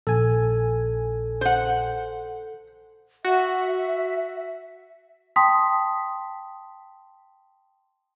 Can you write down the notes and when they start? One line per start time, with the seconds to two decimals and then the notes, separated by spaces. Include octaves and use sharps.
0.07 A#1 A4 G#5
1.41 C5 F#5
3.25 F#4 E5
5.36 G5 A5 C6 D#6 B6